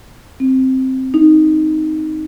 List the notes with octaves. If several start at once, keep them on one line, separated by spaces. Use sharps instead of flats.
C4
D#4